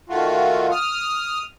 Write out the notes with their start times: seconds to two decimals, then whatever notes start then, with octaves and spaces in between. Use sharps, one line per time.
0.09 D#3 A3 F4 F#4
0.71 D#6 F6